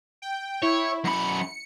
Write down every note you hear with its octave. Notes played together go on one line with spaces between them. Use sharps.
G5
E4 C#5
F#2 B5 C#7